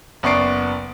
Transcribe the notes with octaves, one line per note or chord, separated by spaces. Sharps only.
F#1 B3 D5 C#6 C7 D7